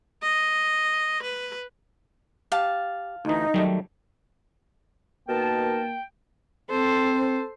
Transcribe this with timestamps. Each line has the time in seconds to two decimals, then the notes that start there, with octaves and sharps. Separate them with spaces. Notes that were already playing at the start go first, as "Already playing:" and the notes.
0.22 D#5
1.23 B4
2.52 G4 F5 A5
3.25 D2 E3 D#4
3.54 D#3 F#3 G3 A3
5.28 B2 A#3 D#4 A#4 G5 A5
6.71 C4 A4 C5